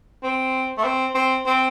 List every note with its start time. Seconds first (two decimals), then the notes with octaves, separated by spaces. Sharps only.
0.23 C4
0.78 A3
0.84 C4
1.15 C4
1.46 C4